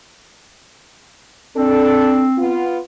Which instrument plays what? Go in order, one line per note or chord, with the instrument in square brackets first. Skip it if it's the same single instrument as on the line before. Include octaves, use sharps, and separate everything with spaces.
[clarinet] C4 [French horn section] D4 A4
[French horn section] B3 F4